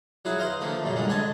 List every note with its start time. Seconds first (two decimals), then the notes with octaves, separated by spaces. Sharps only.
0.25 F#3 E4 F#4 G#4
0.39 B4 C5 D#5 F5
0.61 D3 F3 A3 A#3
0.84 F#2 A#2 C#3
0.96 G#2 D3 G3 G#3
1.08 C#2 D3 D#5 G#5 A5